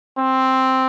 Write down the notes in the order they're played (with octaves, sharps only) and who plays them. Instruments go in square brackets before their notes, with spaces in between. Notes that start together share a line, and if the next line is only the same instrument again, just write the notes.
[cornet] C4